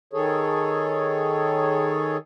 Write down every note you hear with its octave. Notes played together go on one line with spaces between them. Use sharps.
D#3 G#4 A4 C#5